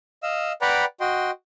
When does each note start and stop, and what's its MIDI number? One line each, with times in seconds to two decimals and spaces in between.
0.23 0.52 75
0.23 0.52 77
0.23 0.52 88
0.61 0.85 71
0.61 0.85 74
0.61 0.85 78
0.61 0.85 79
0.61 0.85 82
0.61 0.85 83
1.00 1.31 66
1.00 1.31 75
1.00 1.31 79
1.00 1.31 84